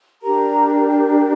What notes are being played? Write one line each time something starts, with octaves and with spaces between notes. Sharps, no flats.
D4 G4 A#4 A#5